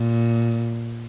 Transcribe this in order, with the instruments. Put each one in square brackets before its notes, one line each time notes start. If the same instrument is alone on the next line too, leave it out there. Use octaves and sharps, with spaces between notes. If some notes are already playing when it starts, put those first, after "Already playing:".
Already playing: [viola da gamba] A#2